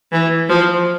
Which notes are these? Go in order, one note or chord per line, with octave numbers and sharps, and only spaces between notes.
E3
F3